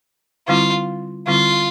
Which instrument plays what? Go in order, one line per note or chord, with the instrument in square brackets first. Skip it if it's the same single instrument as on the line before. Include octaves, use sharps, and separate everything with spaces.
[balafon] D3 G3 C4 E4 [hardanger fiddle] F4
[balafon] D3 G3 C4 E4 [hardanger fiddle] F4